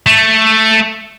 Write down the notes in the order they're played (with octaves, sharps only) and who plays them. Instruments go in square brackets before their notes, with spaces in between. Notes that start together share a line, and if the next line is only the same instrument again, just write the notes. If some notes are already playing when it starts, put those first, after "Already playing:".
[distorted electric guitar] A3